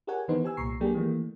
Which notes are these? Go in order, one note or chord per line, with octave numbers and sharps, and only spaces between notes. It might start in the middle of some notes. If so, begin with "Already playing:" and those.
G4 G#4 A#4 C#5 F#5 G#5
D#3 E3 B3 D#4 B4 C5
G4 G#5 E6
C2 A#2 A#5 C#6 C7
F#3 A3 A#3 D4 G4 G#4
D#3 E3 A3 A#3